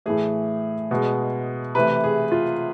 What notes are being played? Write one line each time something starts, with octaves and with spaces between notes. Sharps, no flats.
A2 E3 A3 G#4
B2 G#3
C3 E3 A3 B4
G#4
F4